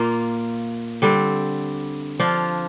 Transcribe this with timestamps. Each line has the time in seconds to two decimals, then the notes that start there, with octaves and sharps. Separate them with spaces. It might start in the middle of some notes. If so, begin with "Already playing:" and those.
Already playing: A#2 A#3 F4
1.02 D3 G3 C4
2.19 F3 D4 F4